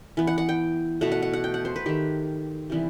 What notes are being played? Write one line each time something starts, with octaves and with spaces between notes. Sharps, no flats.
E3 B3
F#5
F#5
G5
B2 A3 F#5
F#5
F#5
F#5
G5
F#5
C5
B4
D#3 A3 G4
C3 E3 G3 B3